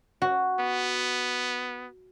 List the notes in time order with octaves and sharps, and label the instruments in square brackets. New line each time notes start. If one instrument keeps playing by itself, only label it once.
[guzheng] F#4
[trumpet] B3